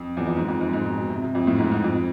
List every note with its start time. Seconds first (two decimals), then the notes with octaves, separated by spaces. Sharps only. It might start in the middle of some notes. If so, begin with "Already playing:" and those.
Already playing: F2
0.17 E2
0.27 F2
0.36 G#2
0.48 F2
0.61 G#2
0.73 G#2
0.86 B2
0.97 B2
1.09 C3
1.22 C3
1.35 F2
1.47 A2
1.59 G#2
1.72 G#2
1.84 F2